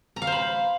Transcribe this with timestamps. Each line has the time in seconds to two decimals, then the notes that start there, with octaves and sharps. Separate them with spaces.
0.16 A#5
0.22 F5
0.27 C5
0.32 B5